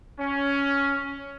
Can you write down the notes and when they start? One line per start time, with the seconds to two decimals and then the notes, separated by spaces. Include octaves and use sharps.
0.19 C#4